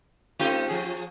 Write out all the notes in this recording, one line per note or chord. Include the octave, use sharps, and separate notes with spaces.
A3 C4 C#4 D#4 F4 G4
F3 G#4